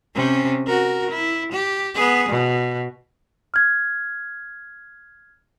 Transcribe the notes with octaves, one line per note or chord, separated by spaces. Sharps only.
C3 C#4
F#4 A#4
E4
G4
B3 G#4
B2
F6 G#6